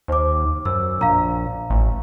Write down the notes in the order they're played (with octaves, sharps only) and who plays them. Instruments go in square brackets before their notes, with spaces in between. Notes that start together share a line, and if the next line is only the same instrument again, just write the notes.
[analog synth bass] D#2 [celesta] C5 D6
[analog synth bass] F#2 [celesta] E6
[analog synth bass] A#1 [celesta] F5 A#5
[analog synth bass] A1